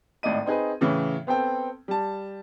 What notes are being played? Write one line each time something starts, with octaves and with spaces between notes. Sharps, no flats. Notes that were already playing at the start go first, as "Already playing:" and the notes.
G#1 A2 D5 D#5 D#7
C4 D#4 G#4 B4
A2 C#3 E3
B3 C4 A4 G5
G3 A5